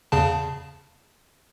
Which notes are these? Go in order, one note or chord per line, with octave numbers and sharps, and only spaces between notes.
E2 C#3 A5